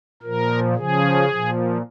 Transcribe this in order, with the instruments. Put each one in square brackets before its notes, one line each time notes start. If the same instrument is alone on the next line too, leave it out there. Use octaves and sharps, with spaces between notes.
[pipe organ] A#2 F3 A#4
C#3 F3 G#4
A#2 F3